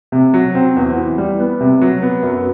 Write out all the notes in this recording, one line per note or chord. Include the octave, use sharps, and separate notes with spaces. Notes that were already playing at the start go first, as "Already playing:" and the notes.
C3
F#3
C4
E2
E3
G3
B3
C3
F#3
B3
F#2